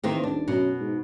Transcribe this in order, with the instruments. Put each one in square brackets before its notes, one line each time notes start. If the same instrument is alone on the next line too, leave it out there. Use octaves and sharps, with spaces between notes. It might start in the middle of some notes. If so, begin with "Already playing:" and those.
[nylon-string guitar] D#3 A#3 C4 [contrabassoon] E3
[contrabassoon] D#1 [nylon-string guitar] D4
[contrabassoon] F#2 [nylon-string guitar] B2
[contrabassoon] G#2